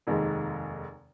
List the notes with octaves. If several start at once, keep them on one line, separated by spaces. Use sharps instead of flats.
F1 D#2 D#3 G#3